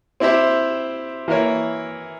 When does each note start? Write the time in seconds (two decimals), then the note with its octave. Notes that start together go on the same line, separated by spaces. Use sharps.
0.20 C4 E4 G4 C5 E5
1.28 E3 A#3 E4 A#4 C#5